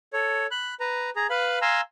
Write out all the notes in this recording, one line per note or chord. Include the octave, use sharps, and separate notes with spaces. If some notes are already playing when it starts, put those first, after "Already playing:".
A4 C#5
B5 F#6
B4 A#5
G#4 A#5
B4 F5 B5
F5 G#5 A#5 C6 E6